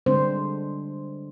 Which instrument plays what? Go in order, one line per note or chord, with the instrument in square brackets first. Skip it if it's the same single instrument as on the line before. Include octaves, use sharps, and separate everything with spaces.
[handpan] D3 G3 G#3 C4 D4 C5